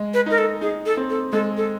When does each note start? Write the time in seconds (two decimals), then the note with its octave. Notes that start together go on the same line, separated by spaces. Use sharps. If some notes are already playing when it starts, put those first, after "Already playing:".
Already playing: G#3
0.14 B4
0.26 D#4 A#4
0.38 A4
0.61 D#4 G#4
0.86 A4
0.97 C4
1.10 A4
1.32 G#3 A4
1.57 A4